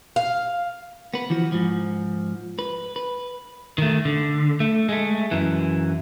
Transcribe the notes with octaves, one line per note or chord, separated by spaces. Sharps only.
F5
B3 B4
E3 F3 F#4
G#2 F3
B4
B4
D#3 A3
D3
A3
G#3 A3
F#2 E3